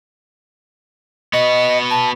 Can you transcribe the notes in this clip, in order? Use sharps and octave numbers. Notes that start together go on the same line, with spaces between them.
B3 F#4 D#5
A5